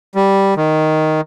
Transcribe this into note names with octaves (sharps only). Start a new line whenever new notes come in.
G3
D#3